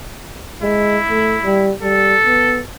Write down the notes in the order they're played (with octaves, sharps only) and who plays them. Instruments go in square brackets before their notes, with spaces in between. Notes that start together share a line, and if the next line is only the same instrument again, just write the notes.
[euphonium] G#3 [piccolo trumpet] E4
[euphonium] A3
G3
[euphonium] G3 [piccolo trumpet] A4
[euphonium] B3